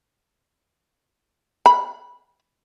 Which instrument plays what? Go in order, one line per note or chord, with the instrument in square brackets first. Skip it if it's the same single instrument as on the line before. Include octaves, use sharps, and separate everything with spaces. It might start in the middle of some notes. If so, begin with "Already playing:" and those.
[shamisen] B5